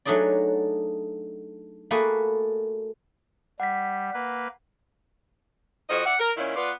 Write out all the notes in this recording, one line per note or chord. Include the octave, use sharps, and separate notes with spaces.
F#3 A3 D4 D#4 G#4 D5
A3 A#3 F#4 G#4 B4
G3 F#5 B6
A#3 B4
F2 F3 F#4 D#5
E4 D5 F#5
A#4
A#2 D#3 C#4 E4
B3 F4 B4 D5